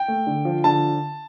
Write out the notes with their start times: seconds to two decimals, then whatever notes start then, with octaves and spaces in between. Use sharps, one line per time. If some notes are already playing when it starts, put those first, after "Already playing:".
Already playing: G5
0.08 A3
0.27 D3
0.45 F3
0.64 D3 A5